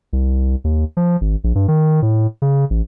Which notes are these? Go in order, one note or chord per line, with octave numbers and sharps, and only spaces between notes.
C2
D#2
F3
G#1
A#1
G2
D#3
A2
C#3
A1